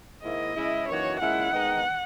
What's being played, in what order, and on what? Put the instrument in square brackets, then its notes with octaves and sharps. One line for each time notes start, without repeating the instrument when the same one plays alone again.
[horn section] G#2 D#3 A#3 E4 [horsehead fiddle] D#5
[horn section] C#3 G#3 C#4 E4
[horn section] F#2 E3 A#3 D#4 F#4 [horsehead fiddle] C#5
[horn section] A#2 G#3 C#4 E4 [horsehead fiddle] F#5
[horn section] D#3 G#3 B3 D#4